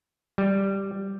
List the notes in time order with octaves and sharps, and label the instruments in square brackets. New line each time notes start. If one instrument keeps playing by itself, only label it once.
[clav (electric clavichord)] G3